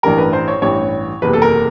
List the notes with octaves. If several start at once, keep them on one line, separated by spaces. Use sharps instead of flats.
A1 G2 E3 G3 A#4
B4
C5
C#5
A1 G2 E3 G3 C#5
F#1 E2 C3 B4
A4
A#4